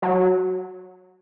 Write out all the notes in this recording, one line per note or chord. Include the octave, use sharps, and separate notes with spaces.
F#3